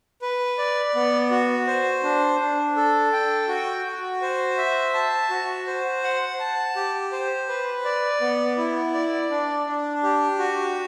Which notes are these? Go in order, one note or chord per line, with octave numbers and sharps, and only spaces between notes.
B4
D5
B3
F#4
C5
D4
D4
A4
G5
F#4
F#4
C5
E5
A5
F#4
C5
F#5
A5
G4
C5
B4
D5
B3
E4
D5
D4
D4
G4
F#4